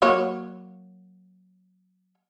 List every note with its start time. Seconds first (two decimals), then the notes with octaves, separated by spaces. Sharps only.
0.02 F#3 A#3 C#5